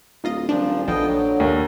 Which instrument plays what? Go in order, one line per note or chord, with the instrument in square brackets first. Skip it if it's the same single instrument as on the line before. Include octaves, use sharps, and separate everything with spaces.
[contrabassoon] D1 [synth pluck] D#4 F4 D#5
[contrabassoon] D#1 [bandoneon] A#2 F3 [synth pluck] D4
[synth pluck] A#1 F3 [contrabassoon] D3 [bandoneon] B3 D#5 G5
[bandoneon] F#3
[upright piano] D#2